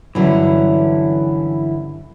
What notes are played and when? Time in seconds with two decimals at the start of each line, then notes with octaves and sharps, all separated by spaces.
0.15 G2 D3 E3 F#3 C#4 E4